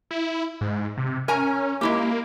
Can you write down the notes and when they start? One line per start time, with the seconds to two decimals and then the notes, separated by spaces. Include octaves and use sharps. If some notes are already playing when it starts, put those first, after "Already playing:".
0.11 E4
0.61 G#2
0.98 C3
1.28 C#4 A#4 G#5 A#5
1.81 G#3 A#3 E4 G4